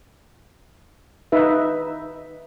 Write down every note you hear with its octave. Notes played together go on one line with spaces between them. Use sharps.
D#4 B4 E5